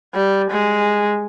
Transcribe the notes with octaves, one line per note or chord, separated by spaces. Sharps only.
G3
G#3